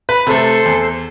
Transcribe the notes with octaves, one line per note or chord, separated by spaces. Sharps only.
B4 B5
C3 A3 A4 C5
E2